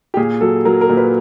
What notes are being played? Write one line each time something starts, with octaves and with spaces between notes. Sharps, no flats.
G4
A#2 G#4
F#3 A4
F#3 A#4
A#4
A#2
B4